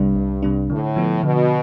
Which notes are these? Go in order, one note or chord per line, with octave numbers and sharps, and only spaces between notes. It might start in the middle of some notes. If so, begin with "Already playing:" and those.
Already playing: C2 G2 C3 G3 D4
C2
C3 G3 D4
A2 D3
F3 B3
B2 D3